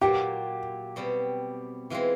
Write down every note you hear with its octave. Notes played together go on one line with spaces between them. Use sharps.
A#2 F#3 A#3 G4
B2 G3 C4
E3 G#3 C4 F4